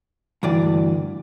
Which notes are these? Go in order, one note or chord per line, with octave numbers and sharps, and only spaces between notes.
D2 G2 E3 D5